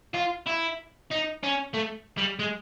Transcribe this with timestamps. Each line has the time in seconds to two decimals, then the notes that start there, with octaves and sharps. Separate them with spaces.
0.14 F4
0.46 E4
1.11 D#4
1.43 C#4
1.74 A3
2.18 G3
2.39 G#3